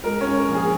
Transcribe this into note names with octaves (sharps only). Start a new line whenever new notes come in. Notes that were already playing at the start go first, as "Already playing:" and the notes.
G#3 A#4
C#4 C#5
G#2
A#4
A#1
G#4